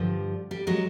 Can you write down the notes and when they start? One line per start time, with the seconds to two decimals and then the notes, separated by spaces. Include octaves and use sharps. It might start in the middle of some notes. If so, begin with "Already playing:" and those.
Already playing: G2 D3 F3 G3
0.51 G3
0.67 F#3 G#3